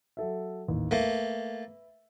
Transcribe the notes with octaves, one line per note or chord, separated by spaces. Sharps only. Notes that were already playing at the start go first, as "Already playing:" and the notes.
F#3 A4 E5
A1 D#2
A3 A#3 B4 E5